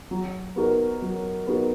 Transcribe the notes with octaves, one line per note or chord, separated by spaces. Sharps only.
F#3
B3 D#4 F#4 A#4
F#3
B3 D#4 F#4 A#4